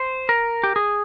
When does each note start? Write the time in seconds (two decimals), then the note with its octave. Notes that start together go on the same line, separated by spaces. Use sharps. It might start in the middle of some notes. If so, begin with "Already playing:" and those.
Already playing: C5
0.29 A#4
0.64 G4
0.76 G#4